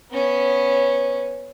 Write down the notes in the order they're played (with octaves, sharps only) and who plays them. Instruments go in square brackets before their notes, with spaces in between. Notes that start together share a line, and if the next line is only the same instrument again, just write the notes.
[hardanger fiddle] B3 C#4